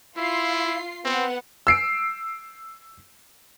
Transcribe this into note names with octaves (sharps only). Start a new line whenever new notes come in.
E4 F4 C7
B3 C4 F#5
E6 C7 D7